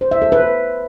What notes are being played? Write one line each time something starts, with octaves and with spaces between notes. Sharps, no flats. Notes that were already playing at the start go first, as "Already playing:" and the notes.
C5
E5
A4
B4